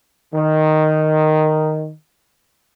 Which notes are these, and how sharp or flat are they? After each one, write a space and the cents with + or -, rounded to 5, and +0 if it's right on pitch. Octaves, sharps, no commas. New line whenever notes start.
D#3 -5